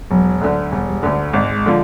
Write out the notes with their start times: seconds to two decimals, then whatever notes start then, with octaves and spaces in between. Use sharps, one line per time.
0.10 E1 F#3
0.41 D2 D3
0.72 E1 G3
1.03 D2 D3
1.33 G#1 G#3
1.66 D3 F3